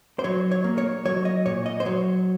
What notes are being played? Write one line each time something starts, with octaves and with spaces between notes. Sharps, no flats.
C5
F#3 C#5
C#5
A#3
C#5
F#3 C#5
D#5
A#2 C#5
D#5
C5
F#3 C#5